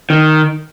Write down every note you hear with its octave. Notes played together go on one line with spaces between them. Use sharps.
D#3